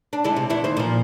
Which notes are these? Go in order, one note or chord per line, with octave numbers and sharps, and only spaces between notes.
D4
D3 G#3 E4
C3
E2 D3 E4
D#2 C5
A#2 F3